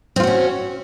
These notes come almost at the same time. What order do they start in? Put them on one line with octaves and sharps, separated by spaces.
C4 F4 F#4 C#4